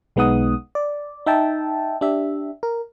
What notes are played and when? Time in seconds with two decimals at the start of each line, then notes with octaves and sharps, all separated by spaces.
0.16 B1 G#3 B3 D#4 F#5 D#6
0.75 D5
1.26 D#4 E5 G5 A5
2.01 D4 G4 E5
2.63 A#4